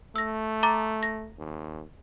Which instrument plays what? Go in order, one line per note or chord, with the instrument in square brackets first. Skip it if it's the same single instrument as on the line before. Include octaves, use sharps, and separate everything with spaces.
[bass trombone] A3 [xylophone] E6 A#6
[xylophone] A#5 D6 A6
A#6
[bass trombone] D#2